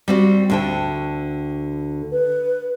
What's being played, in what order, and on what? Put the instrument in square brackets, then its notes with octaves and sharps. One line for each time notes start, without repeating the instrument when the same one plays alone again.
[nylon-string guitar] G3 C4 F#4
D2 D3 G5
[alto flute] B4